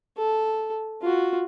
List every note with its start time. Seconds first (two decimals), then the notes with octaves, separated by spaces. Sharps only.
0.17 A4
1.01 F4 F#4